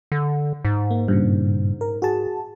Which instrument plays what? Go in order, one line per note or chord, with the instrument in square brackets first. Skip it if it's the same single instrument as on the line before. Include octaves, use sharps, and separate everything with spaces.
[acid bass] D3
G#2
[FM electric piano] A#3
G2 A#2 C#3
A#4
F#4 G#4 A5